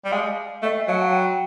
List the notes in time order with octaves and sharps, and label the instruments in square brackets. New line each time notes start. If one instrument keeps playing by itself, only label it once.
[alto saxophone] G3
[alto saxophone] G#3 [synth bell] F5
[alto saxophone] A3
[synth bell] D#5
E5
[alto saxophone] F#3 [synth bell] F5
[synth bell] F#5
G5